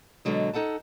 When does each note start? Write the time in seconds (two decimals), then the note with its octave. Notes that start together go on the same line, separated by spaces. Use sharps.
0.25 B2 D3 F#3 G#3
0.53 D#4 A4 F#5 A5